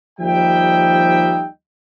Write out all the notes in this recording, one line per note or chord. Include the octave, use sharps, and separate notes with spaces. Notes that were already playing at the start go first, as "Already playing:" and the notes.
D#2 F3 G3 D#4 E5 G5